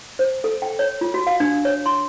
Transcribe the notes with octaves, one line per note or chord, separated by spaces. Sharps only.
C5
A4
G5
C#5
F4
F#4
F5
D4
C#5
C6